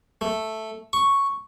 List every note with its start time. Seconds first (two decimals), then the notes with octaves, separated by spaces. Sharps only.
0.21 A3
0.93 C#6